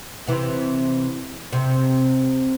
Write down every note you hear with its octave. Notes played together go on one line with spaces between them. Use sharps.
C3 E3
C3